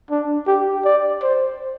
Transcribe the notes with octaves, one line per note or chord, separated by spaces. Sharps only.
D4
G4
D5
C5